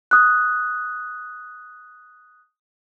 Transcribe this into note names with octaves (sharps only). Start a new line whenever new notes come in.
D#6 F#6